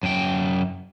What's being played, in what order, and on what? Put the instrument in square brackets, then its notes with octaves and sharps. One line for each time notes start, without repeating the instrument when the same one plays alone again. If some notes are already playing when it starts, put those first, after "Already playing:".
[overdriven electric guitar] F#2 G5